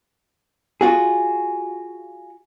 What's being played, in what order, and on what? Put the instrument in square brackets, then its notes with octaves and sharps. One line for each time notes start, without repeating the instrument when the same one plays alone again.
[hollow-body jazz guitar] F4 F#4 G#4